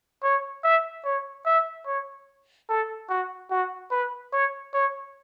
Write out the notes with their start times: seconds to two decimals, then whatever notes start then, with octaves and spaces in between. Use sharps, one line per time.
0.23 C#5
0.64 E5
1.05 C#5
1.46 E5
1.86 C#5
2.69 A4
3.10 F#4
3.50 F#4
3.91 B4
4.33 C#5
4.74 C#5